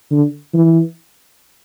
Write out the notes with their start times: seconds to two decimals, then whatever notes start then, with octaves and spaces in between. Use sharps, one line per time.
0.12 D3
0.54 E3